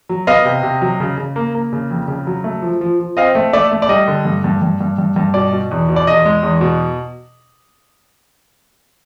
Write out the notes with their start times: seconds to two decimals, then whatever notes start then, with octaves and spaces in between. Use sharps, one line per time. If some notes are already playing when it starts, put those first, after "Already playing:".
0.09 F#3
0.27 B3 D#5 F5
0.45 C3
0.63 C3
0.81 F#3
1.00 C#3
1.18 C#3
1.36 A#3
1.55 A#3
1.73 C#3
1.90 F2
2.08 C#3
2.27 F#3
2.44 A3
2.62 F3
2.81 F3
3.00 F3
3.17 C4 D#5 F5
3.35 A3
3.53 A3 D5 E5
3.71 A3
3.82 D5
3.89 G3 D#5
4.08 D3
4.25 G2
4.44 G2
4.62 G2
4.81 G2
4.98 G2
5.16 G2
5.34 B2 D5
5.52 B2
5.71 E2
5.89 B2
5.96 D5
6.07 E2 D#5
6.25 G#3
6.43 E2
6.61 B2